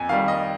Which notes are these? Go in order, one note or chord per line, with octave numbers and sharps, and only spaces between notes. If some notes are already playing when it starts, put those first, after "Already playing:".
Already playing: F2 G#5
D#3 G3 F5
D#5